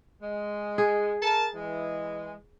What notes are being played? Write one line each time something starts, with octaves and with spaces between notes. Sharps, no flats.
G#3
G#4
A#4 A5
E3 G#3